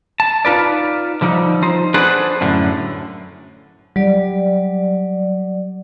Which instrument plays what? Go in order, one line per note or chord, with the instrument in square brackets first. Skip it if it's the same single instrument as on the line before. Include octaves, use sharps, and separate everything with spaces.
[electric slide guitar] A5
D#4 F4 B4 D5
D3 F3 G3 D#4
F3 D#4 C5
D4 G#4 A4 B4 C5 F#5
F#2 A2 D3
[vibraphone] F#3 D5 [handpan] G3